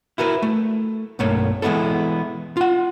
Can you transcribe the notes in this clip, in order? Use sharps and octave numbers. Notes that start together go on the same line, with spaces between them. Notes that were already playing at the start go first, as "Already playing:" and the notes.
E4 F#4 A#4 B4
A3
B1 G2 A3 A#3 C#5
E3 G#3 A#3 B3 E4 A4
F4 F#5